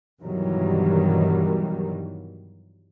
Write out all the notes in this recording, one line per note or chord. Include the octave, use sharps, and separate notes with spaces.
G2 B2 D#3 E3 F#3 G3